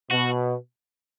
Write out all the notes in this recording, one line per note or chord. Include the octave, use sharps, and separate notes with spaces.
B2 F#4